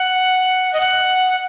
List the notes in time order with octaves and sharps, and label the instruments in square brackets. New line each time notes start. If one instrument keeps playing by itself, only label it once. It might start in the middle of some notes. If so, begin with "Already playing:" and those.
Already playing: [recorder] F#5
D#5
F#5